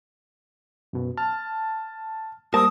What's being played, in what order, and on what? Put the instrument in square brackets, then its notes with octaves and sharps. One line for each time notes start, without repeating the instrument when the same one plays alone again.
[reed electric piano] F#2 B2
[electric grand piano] A5 [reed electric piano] F6
[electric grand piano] G3 A#3 [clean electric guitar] A#4 A5 [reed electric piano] C5 E6 [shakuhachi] D#6